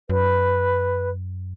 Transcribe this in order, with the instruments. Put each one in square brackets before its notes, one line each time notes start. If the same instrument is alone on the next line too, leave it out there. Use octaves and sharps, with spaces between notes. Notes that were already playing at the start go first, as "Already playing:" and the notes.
[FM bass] F#2 [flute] B4